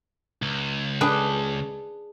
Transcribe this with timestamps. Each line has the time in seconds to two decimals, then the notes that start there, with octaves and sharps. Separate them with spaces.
0.42 C#2
1.01 D4 G#4 B4